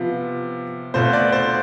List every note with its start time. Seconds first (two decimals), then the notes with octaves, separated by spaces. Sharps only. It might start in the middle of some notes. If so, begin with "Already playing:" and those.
Already playing: C3 F3 B3 F4
0.94 B2 A3 C4 F4 C5
1.13 D5
1.32 C5